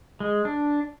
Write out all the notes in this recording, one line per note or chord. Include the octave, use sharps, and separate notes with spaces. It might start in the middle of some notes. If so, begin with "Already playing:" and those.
G#3
D4